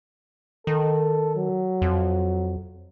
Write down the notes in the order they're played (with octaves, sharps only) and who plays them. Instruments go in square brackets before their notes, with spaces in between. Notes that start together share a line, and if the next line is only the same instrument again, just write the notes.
[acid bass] D#3 [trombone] A4
[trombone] F#3
[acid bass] F2